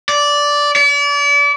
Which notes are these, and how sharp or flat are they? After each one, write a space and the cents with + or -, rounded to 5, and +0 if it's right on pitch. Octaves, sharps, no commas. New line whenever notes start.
D5 -10
D5 -40